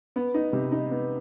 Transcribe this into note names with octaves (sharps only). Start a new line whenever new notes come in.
B3
D#4
C3
D#4
B3